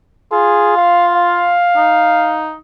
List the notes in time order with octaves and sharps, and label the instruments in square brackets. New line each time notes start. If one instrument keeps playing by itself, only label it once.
[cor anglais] F4 [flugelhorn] G#4
[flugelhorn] F5
F5
[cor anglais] D#4